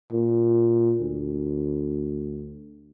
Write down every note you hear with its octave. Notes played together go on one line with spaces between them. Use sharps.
A#2
D2